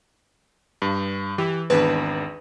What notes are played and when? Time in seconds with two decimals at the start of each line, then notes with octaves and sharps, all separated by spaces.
0.82 G2
1.38 E3 G4
1.70 G#1 E2 D4 B4